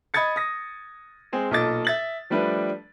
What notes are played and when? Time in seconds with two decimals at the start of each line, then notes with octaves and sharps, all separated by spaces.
0.14 D#5 B5 D#6 G#6 A6 C#7
0.36 D#6 A#6
1.32 G#3 C4 G#4
1.51 B1 A#2 A4 D#5 D6 A6
1.85 E5 A6 F#7
2.30 F3 G3 A3 D4 B4